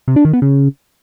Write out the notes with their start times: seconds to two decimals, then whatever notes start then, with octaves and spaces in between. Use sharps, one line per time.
0.08 C3
0.16 D4
0.25 D#3
0.33 B3
0.42 C#3